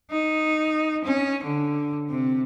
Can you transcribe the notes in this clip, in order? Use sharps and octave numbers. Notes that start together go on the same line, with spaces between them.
D#4
C#4
D3
C3